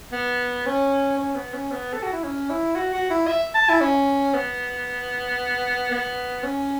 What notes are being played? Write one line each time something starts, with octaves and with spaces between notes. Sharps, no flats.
B3
C#4
C#4
B3
C#4
B3
A4
F#4
E4
C#4
E4
F#4
F#4
E4
E5
A5
E4
C#4
B3
B3
C#4